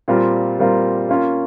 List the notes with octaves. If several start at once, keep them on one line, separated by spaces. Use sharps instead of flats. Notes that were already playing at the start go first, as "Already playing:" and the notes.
A#2 G3 C4 F4 A#4
A#2 G3 C4 F4 A#4
A#3 C#4 F4